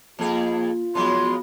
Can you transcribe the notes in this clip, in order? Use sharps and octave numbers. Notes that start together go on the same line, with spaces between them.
F2 A#3 F4 G#4
F3 F#3 G#3 B3 F#4 B5 C6